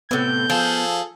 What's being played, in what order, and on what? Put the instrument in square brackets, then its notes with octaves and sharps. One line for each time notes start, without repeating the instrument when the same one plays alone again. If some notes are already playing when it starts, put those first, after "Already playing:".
[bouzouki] A2 C3 [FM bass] B3 [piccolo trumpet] G6
[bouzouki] F3 [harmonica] G#4 A4